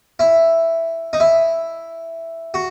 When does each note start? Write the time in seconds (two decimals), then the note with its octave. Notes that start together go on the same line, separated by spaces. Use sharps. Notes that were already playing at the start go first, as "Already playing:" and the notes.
0.19 E4
1.13 D#4
1.20 E4
2.54 F#4